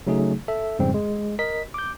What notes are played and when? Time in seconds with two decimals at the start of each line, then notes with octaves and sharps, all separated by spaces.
0.07 C#3 F#3 A3 D#4 G#4
0.48 A4 E5
0.79 F2 G#2 C#3 G3 C4
0.94 G#3
1.39 A#4 D#5 B6
1.74 D6 G6